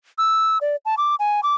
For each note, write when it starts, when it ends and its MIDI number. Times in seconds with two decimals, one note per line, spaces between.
0.18 0.58 88
0.61 0.76 74
0.85 0.95 81
0.97 1.15 86
1.19 1.41 80
1.43 1.56 86